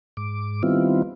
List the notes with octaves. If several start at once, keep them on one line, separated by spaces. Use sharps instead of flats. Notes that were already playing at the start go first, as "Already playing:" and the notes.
G#2 D6
D#3 G3 B3 C4 E4 F4